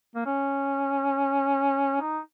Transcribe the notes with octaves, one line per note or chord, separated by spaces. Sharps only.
A#3
C#4
D#4